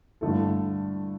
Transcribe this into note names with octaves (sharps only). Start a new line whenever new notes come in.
G2 D3 A3 E4 A4